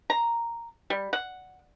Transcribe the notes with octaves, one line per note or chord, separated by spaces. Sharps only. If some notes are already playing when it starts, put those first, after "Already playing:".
A#5
G3
F#5